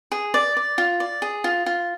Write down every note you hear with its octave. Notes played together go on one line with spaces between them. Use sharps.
G#4
D5
D5
F4
D5
G#4
F4
F4